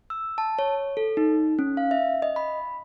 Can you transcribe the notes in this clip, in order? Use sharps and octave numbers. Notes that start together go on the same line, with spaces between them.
E6
A5
C#5
A4
D#4
C#4
F5
E5
D#5
B5